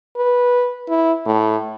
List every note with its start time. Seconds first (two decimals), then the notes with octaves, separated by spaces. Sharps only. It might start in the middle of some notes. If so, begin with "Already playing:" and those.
0.16 B4
0.89 E4
1.26 A2